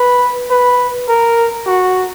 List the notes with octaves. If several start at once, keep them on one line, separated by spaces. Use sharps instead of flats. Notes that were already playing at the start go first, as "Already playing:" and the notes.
Already playing: B4
B4
A#4
F#4